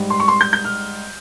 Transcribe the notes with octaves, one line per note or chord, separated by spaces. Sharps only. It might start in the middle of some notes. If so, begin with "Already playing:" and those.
Already playing: G#2 G3
C6
C#6
C6
G6
G6
F6